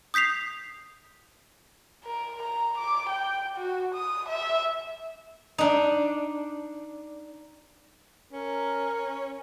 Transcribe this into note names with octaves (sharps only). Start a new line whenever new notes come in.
D#6 G6 B6 C7 F7
A#4
A#5
D6
G5
F#4
D#6
E5
D4 D#4
C#4 A#4